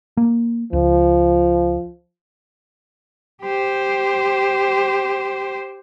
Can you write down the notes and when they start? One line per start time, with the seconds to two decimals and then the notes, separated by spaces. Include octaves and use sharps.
0.17 A#3
0.73 C#2 F3
3.43 G4 C5